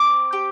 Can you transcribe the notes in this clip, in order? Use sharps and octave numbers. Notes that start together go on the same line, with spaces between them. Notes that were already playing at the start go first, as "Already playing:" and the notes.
Already playing: C4 D6
G4